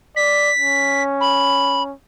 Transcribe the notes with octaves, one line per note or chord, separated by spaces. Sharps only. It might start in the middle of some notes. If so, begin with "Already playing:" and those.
D5 B6
C#4
B5